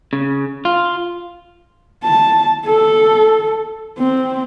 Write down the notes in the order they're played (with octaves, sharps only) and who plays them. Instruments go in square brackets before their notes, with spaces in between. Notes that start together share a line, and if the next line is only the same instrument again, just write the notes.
[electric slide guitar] C#3
F4
[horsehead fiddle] A5
A4
C4